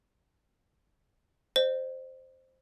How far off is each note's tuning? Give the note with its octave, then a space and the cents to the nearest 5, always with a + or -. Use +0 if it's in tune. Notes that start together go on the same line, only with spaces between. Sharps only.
C5 +0 D#5 -35